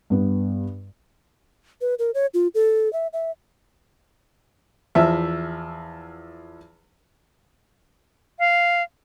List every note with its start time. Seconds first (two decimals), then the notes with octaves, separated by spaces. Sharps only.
0.10 G2 B3
1.81 B4
1.99 A#4
2.14 C#5
2.34 F4
2.55 A4
2.93 E5
3.13 E5
4.95 E2 F3 E5
8.39 F5